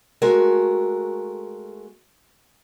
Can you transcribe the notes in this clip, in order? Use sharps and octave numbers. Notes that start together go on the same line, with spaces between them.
G#3 A3 F#4 A#4